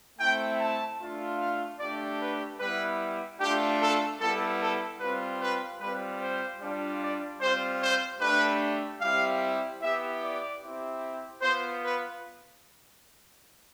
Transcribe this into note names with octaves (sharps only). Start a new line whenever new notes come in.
A3 C4 E4 G5
A5
A3 D4 F4
F5
A3 D4 G4 D5
B4
G3 B3 E4 B4
A3 D4 F4 G4
A4
G3 B3 E4 A4
A4
G3 C4 F4 B4
B4
G3 C4 F4 B4
C5
G3 D4 F4
D5
G3 C4 F4 C5
C5
A3 D4 G4 B4
G3 C4 E4 G4 F5
B3 E4 G4 E5
D5
C4 E4 G4
B3 F4 C5
B4